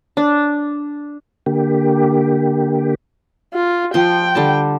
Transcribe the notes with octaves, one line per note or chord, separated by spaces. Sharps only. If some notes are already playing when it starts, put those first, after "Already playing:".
D4
D3 A#3 G4
F4
F3 G5 C6
D3 G3 A5